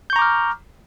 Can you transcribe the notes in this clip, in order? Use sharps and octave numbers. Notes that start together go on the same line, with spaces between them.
A#5 C#6 D6 F6 G6